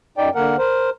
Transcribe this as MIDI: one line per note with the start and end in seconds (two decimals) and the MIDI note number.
0.18 0.30 42
0.18 0.30 63
0.18 0.30 74
0.18 0.30 79
0.35 0.56 50
0.35 0.56 58
0.35 0.56 70
0.35 0.56 78
0.58 0.90 70
0.58 0.90 72